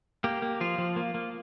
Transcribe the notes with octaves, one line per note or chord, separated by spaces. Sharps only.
A#3 G4
A#3
F3 F4
F3
A#3
A#3